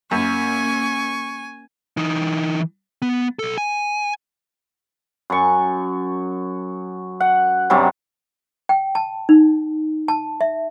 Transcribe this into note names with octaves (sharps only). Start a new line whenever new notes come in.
F#2 A#3 C#4 G#5 C#6
E3 D#4
B3
B1 A4
G#5
F#2 C#6
F#5
G2 C3 F#3 G3
G5
A5
D#4
A5
E5